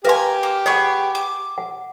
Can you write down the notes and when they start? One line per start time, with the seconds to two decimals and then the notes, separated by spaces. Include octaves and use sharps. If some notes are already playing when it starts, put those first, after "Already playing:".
0.05 G4 A#4 B4 F5 G#5 C6
0.43 A#3
0.66 B3 G#4 D#5 F#5 C#6
1.15 D6
1.58 F#5